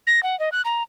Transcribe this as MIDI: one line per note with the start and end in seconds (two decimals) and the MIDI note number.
0.07 0.23 94
0.23 0.38 78
0.40 0.49 75
0.52 0.62 90
0.65 0.83 82